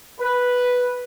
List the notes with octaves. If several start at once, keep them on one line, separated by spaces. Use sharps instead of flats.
B4